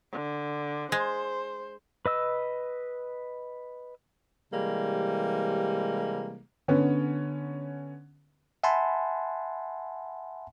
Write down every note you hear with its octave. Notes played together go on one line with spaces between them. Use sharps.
D3
G#3 C5
B4 D#5 E6
C3 E3 G3 G#3 A#3
D3 B3 C#4
E5 F#5 G#5 A5 B5 C6